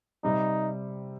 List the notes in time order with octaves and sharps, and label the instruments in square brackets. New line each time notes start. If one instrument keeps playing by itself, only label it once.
[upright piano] C3 G3 C4 [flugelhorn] D#4